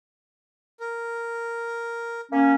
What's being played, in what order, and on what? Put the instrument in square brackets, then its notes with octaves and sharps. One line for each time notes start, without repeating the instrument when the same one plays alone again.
[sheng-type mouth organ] A#4
[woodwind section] A#3 C#4